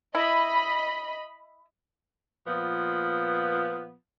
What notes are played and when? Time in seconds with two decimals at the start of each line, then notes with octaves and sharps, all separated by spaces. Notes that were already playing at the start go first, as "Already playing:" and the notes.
0.15 E4 D#5 B5
2.47 A#2 F3 B3